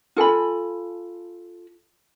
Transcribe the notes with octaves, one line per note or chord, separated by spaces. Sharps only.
F4 A4 G#5 B5